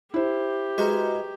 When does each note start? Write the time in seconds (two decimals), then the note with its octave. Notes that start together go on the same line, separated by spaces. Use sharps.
0.14 E4 G4 C5
0.78 G#3 F#4 B4 A#5 C#6